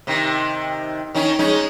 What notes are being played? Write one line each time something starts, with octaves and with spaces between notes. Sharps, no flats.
C3 D#3
D#3 C#4 D#4
G#3 C#4 D#4